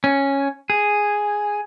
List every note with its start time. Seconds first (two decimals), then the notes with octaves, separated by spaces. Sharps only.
0.04 C#4
0.70 G#4